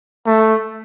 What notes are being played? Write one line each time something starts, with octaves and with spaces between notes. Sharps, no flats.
A3